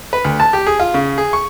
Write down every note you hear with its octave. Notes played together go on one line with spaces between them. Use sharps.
B4
D2
A5
G4
G#4
F4
C#3
G#4
C#6